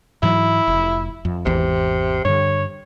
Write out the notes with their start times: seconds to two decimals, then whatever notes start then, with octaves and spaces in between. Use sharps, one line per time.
0.23 G#2 E3 F#3 E4
0.67 F1
1.25 F2
1.45 G#1 E2 C3 E3
2.25 G2 D3 C#5